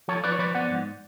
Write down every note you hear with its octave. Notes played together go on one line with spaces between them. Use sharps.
F3 A4 C#5
F3 B4 D5
C#5
F3 B4 D5
B3 D5 F#5
G#2